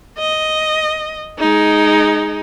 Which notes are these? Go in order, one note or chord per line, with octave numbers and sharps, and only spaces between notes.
D#5
G#3 D#4